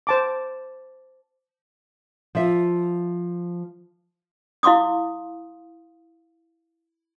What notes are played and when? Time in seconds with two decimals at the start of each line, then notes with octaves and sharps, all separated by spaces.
0.07 C5 A5 D6
2.35 F3 E5
4.63 E4 F5 C6 D6 D#6